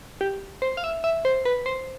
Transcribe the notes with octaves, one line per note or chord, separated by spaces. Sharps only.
G4
C5
F5
E5
E5
C5
B4
C5